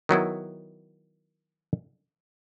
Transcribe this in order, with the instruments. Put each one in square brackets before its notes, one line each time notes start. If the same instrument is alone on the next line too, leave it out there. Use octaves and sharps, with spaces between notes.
[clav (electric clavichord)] D#3 F#3 B3 E4